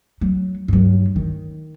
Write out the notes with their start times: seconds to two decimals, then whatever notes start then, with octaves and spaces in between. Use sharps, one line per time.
0.21 F#3
0.68 G2 F#3
1.16 D#3